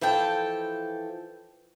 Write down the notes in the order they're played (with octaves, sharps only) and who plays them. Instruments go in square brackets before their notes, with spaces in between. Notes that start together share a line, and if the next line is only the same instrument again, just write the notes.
[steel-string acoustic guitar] E3 F3 A4 G5 A5